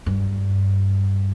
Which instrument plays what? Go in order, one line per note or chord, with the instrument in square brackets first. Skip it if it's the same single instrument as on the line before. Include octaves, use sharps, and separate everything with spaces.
[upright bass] G2